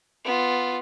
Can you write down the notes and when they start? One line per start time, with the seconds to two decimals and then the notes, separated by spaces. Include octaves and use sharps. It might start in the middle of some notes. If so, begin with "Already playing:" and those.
0.24 B3 F4